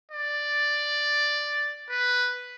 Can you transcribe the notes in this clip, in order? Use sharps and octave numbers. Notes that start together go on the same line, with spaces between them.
D5
B4